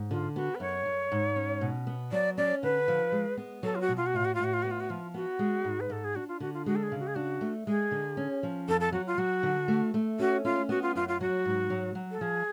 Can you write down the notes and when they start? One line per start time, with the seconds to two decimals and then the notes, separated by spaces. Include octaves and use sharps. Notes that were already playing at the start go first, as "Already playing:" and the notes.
Already playing: G#2
0.10 D3 F4
0.35 B3 F#4
0.55 B4
0.60 F#2 C#5
0.86 F#2
1.12 G#2
1.36 C#4
1.61 B2
1.87 B3
2.12 F#3 D5
2.37 C#4 D5
2.63 D3 B4
2.88 F3
3.12 G#3
3.37 B3
3.63 F#3 A4
3.75 F4
3.80 F#4
3.89 B2
3.96 F4
4.06 F#4
4.14 A2 F4
4.24 F#4
4.34 F4
4.39 A2 F#4
4.53 F4
4.62 B3 F#4
4.70 F4
4.80 F#4
4.89 F3 F4
5.14 B3 F#4
5.39 G#3
5.65 G#2
5.80 B4
5.90 G#2 A4
6.04 G#4
6.15 D4 F#4
6.28 F4
6.40 D3 F#4
6.53 F4
6.66 G#3 F#4
6.75 A4
6.83 G#4
6.92 C#3
6.99 F#4
7.07 G#4
7.15 D4 F#4
7.41 A3
7.67 G#3 G#4
7.91 D3
8.17 C#4
8.43 F3
8.68 F2 A4
8.80 A4
8.92 F#3 F#4
9.06 F4
9.18 F#3 F#4
9.43 D3
9.68 A3
9.94 A3
10.19 C#4 F#4
10.44 C#4 F4
10.69 B3 F#4
10.82 F4
10.95 F#2 F4
11.08 F4
11.21 F#3 F#4
11.45 G#2
11.70 F#3
11.95 F#3
12.11 A4
12.21 F3 G#4